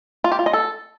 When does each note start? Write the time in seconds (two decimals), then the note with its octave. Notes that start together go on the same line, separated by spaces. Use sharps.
0.24 F4
0.32 G4
0.39 F4
0.46 D#5
0.53 A4